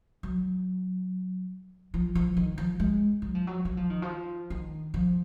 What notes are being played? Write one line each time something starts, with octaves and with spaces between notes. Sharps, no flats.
F#3
F3
F3
D#3
F3
G#3
F#3
F3
F#3
F#3
F3
D#3
F3
D#3
F3